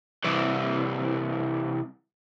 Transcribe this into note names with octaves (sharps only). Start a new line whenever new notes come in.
C2 E3